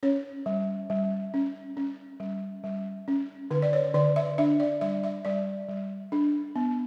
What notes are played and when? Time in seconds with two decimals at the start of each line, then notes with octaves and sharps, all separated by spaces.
0.03 C#4 C#5
0.46 G3
0.90 G3
1.34 C#4
1.77 C#4
2.20 G3
2.64 G3
3.08 C#4
3.51 D3 B4
3.62 D5
3.73 C#5
3.94 D3 D5
4.16 E5
4.38 D4 E5
4.60 D5
4.81 G3 E5
5.03 E5
5.25 G3 D5
5.69 G3
6.12 D4
6.56 B3